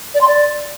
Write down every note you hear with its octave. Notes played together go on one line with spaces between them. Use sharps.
D5
C6
D5